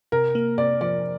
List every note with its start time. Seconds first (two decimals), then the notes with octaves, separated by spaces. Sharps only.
0.12 C3 A#4
0.35 A#3
0.58 C3 D5
0.81 F3 D5